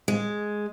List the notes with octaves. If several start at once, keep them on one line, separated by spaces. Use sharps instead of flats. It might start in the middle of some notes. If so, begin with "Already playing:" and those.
G#3